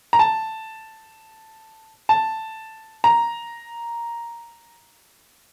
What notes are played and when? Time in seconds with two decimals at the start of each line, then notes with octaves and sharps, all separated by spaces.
0.13 A#5
0.19 A5
2.09 A5
3.04 A#5